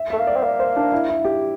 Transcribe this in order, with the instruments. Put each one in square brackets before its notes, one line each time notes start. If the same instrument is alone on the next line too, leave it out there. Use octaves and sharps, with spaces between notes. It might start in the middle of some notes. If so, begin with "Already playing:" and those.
Already playing: [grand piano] E5
[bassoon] A3 [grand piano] E5
[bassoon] A#3
[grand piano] D5
[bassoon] C4
[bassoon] A#3 [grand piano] D5
[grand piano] C5
D4
E4
E4
G4